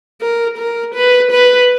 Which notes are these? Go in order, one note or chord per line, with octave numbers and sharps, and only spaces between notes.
A#4
A#4
B4
B4